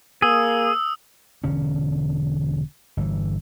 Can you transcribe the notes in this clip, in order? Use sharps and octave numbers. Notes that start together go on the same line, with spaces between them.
A#3 G#4 D#6 E6
E1 D3 C#4
G1 D3 E3